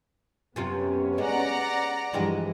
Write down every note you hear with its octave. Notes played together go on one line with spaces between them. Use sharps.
F#2 C3 B3 C#4 F4
G#3 D5 F#5 A#5
G2 E3 F3 G#3 G4